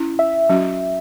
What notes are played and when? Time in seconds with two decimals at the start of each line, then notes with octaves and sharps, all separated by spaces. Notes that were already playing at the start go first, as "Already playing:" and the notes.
Already playing: C#4 E4
0.19 E5
0.49 F#3 C#4 F#4